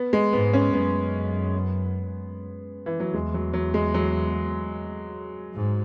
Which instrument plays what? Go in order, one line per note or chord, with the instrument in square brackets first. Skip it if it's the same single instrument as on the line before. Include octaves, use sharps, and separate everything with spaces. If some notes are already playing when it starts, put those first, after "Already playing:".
Already playing: [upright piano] B3
G#3
[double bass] G#2 [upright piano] B3
[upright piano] C#4
[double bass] F#2 [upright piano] B3
[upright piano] E3
F#3
[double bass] E2 [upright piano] G#3
[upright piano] F#3
F#3
G#3
F#3
[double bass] G#2